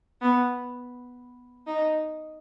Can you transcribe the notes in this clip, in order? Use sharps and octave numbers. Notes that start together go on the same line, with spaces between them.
B3
D#4